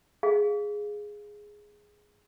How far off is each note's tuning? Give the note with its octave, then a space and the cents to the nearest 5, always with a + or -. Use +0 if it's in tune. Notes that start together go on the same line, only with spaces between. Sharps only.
G#4 +0 F5 +0